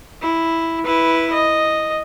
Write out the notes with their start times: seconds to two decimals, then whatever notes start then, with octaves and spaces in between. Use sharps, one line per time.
0.22 E4
0.85 E4 B4
1.33 D#5